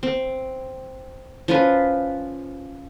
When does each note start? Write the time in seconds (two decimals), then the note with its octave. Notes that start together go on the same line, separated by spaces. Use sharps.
0.03 C4
1.48 F3 C#4 F4 B4